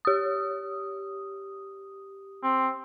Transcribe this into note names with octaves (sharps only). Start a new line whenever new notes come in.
G4 D#6
C4